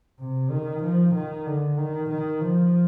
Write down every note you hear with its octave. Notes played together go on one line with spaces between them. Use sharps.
C3
D#3
F3
D#3
D3
D#3
D#3
F3